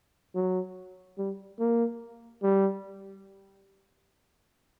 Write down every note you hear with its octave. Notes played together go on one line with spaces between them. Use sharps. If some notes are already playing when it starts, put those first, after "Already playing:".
F#3
G3
A#3
G3